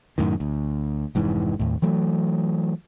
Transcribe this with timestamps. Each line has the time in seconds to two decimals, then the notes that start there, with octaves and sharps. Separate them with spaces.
0.18 F#2 A2 D#3
0.40 D2
1.15 F1 G#2 E3
1.59 D#2 A2
1.82 E3 F#3 A3